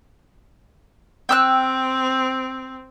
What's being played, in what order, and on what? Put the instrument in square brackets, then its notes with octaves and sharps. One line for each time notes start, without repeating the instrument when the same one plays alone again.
[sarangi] C4 [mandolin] G5 E6 F#6